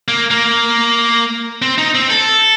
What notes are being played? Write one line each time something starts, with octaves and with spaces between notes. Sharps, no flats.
A#3
A#3
C4
D#4
C4
A4